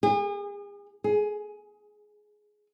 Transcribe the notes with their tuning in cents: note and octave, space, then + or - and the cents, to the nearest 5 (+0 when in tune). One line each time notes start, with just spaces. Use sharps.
G#4 -40
G#4 +15